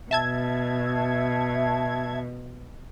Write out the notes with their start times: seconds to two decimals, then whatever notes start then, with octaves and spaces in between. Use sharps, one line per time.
0.11 B2 E5 A5 G#6